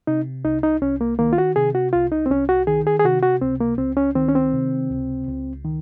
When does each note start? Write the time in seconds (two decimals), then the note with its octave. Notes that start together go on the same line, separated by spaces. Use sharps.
0.07 C3 D#4
0.45 C2 D#4
0.63 D#4
0.82 C2 C#4
1.01 A#3
1.19 D#3 A#3
1.33 F4
1.38 F#4
1.56 C3 G#4
1.75 F#4
1.93 C2 F4
2.12 D#4
2.26 C4
2.30 C2 C#4
2.49 F#4
2.67 D#3 G#4
2.87 G#4
3.00 G#4
3.05 C3 F#4
3.23 F#4
3.41 C#2 C4
3.61 A#3
3.78 C#2 C4
3.97 C#4
4.15 D#3 C4
4.28 C#4
4.35 C4
4.53 C3
4.90 C#2
5.27 C#2
5.64 D#3